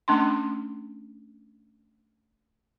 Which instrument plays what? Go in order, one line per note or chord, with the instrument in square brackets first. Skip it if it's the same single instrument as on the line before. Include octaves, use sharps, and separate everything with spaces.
[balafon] A3 C#4 D4 C6